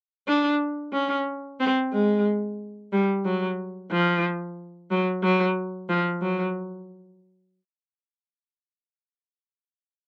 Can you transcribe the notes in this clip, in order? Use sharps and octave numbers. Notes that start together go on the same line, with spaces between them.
D4
C#4
C4
G#3
G3
F#3
F3
F#3
F#3
F3
F#3